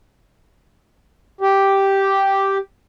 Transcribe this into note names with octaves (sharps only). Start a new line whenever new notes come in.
G4